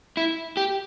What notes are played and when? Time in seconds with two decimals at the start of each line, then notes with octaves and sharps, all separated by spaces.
0.17 E4
0.57 G4